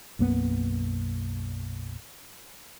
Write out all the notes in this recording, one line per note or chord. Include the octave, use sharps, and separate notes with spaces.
B1 F#2 A#3 B3